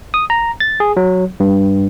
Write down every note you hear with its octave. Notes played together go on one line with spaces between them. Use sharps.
D#6
A#5
A6
G#4
F#3
G2